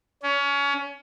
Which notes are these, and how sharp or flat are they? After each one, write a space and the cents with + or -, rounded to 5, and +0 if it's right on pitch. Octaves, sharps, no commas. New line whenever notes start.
C#4 +25